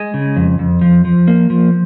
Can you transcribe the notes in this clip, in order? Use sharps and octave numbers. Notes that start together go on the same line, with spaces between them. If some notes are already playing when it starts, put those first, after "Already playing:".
Already playing: G#3
C#3
F2
F2
F3
F3
A#3
F3